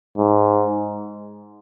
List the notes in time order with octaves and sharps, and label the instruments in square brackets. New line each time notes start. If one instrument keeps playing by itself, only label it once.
[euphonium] G#2